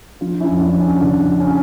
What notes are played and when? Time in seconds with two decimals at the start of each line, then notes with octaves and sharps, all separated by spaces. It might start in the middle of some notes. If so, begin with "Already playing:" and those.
0.21 F3 D4 F4
0.40 C#4 E4
0.48 F2
0.60 D4
0.73 F2
0.80 C#4
1.00 C#3 D4
1.28 F3
1.40 C#4